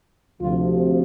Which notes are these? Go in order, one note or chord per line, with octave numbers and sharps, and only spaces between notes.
D2 C3 F3 F4